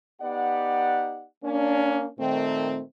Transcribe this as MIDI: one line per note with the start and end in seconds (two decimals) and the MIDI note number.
0.21 1.25 59
0.21 1.25 63
0.21 1.25 67
0.21 1.25 74
0.21 1.25 78
1.44 2.08 58
1.44 2.08 61
1.44 2.08 62
2.19 2.80 46
2.19 2.80 51
2.19 2.80 57
2.19 2.80 60